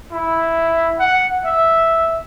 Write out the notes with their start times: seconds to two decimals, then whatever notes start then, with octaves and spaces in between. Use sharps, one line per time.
0.12 E4
1.00 F#5
1.45 E5